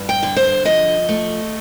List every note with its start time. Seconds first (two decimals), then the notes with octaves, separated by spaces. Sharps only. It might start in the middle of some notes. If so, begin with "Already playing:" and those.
Already playing: G2
0.09 G5
0.23 D3
0.36 C5
0.65 F3 D#5
1.09 A3